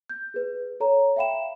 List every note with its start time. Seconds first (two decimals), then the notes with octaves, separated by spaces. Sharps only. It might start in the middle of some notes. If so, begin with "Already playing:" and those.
0.09 G6
0.34 G#4 B4
0.80 A4 C#5 A#5
1.16 E5 F5 G5 B5 E7